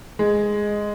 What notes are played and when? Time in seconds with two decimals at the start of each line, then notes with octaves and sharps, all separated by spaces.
0.19 G#3